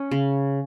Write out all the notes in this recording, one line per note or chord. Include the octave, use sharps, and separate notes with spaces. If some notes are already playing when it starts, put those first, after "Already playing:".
Already playing: C#4
C#3